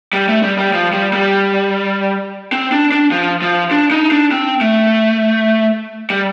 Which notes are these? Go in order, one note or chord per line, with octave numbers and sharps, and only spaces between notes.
G3
A3
G3
G3
F3
G3
G3
C4
D4
D4
F3
F3
D4
D#4
D4
C4
A3
G3